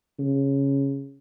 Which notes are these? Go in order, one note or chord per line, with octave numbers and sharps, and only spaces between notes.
C#3